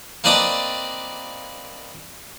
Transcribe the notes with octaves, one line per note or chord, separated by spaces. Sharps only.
A#3 C4 B4 D5 D#5 A5